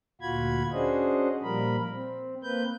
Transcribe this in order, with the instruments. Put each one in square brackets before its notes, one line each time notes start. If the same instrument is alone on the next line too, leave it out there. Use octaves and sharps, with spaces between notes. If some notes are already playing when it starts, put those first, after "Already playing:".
[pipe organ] D2 A#2 F4 F#4 B5 G#6
C#4 D4 F#4 G#4 C5 D#5
A#2 F3 G3 A#4 B5
C4
A#3 C4 B4 G6